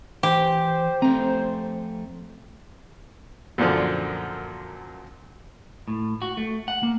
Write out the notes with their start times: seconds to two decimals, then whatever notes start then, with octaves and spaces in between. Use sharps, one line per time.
0.23 E3 G4 C5
1.02 F2 A3 C4 A#5
3.58 F#2 A#2 D3 F3
5.88 A2
6.22 F#4
6.37 A3
6.68 F#5
6.83 A#3